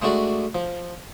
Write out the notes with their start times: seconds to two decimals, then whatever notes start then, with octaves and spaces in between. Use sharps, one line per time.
0.02 G#3 A3 D4 F#4 D5
0.55 F3